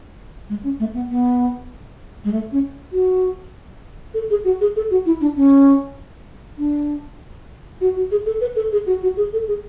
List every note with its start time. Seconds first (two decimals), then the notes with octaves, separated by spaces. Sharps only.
0.49 G#3
0.64 C#4
0.80 A3
0.94 B3
1.10 B3
2.24 G#3
2.32 A3
2.52 C#4
2.92 F#4
4.14 A4
4.30 G#4
4.45 F#4
4.61 G#4
4.76 A4
4.91 F#4
5.06 E4
5.21 D4
5.36 C#4
6.58 D4
7.81 F#4
7.96 F#4
8.11 G#4
8.26 A4
8.41 B4
8.56 A4
8.72 G#4
8.87 F#4
9.03 F#4
9.17 G#4
9.33 A4
9.48 G#4